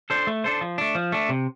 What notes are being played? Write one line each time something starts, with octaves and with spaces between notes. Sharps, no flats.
D4 A4 C5
A3
D4 A4 C5
F3
A3 D4
F3
A3 D4
C3